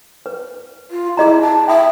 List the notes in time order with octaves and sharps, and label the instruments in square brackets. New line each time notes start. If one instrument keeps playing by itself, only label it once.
[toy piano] B4
[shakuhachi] F4
[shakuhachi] E4 [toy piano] G#4 D#5 A#5
[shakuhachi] A5
[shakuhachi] E5 [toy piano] G5 B5 D#6